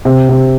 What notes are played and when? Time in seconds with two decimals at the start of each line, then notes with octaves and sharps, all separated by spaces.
0.05 C3
0.29 C3